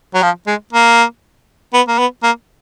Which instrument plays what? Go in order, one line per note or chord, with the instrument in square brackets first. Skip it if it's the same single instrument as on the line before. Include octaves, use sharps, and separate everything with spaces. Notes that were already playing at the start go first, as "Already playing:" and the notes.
[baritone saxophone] F#3
F3
G#3
A#3
B3
A#3
B3
A#3